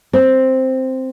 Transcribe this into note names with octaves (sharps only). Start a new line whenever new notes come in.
C4